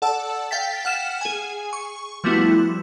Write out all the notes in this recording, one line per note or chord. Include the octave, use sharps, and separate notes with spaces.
A4 D5 F#5 A5 E6
F5 G5 A6 B6
F#5 F6 E7
G#4 G#5
C#6
F3 G3 A3 B3 E4 F#4